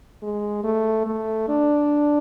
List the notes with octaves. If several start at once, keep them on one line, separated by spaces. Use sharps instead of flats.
G#3
A3
A3
D4